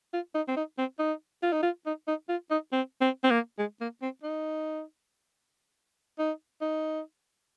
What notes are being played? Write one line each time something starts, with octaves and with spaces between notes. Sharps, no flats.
F4
D#4
C4
D#4
C4
D#4
F4
D#4
F4
D#4
D#4
F4
D#4
C4
C4
C4
A#3
G#3
A#3
C4
D#4
D#4
D#4